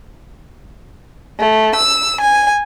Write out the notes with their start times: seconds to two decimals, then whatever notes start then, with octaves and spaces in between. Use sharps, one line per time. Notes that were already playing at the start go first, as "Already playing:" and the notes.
1.39 A3
1.75 E6
2.21 G#5